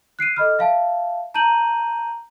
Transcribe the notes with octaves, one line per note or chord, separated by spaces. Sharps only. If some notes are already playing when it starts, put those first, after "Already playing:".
F#6 C7 D7 D#7
A4 D#5 B5 F6
E5 F5 A5
A5 A#5 G6 D#7 F#7